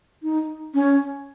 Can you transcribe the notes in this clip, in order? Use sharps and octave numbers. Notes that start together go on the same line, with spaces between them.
D#4
C#4